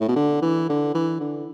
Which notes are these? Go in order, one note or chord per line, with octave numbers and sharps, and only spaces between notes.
A2
B2
D3
E3
D3
E3
D3